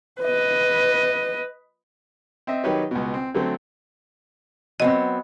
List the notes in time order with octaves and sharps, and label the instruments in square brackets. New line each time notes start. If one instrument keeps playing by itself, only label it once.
[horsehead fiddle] B4 D#5
[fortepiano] C4 D#5 E5
D#3 F#3 D#4 G4 B4 C#5
C#2 B2
C4
D3 F#3 A3 C4 C5
[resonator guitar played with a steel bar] F#3 B3 C4 [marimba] D#5